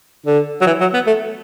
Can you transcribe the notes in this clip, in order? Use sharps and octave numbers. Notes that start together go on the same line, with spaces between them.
D3
F#3
E3
F#3
B3
A3